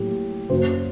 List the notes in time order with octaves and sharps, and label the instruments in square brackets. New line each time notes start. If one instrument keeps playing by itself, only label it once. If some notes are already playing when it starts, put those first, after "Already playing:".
Already playing: [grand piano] A2 F#3 A#3 G4
F#2 F#3 A#3 C5